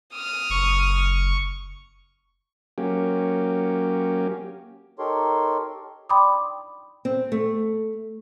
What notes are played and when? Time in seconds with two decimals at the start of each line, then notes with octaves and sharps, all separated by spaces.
0.13 D#6 F6
0.50 F#1 C#6
2.78 F#3 A#3 C#4 G4
4.99 D#4 G4 A4 A#4 C#5 C6
6.09 D5 G5 B5 C6 D6 D#6
7.05 C4
7.32 A3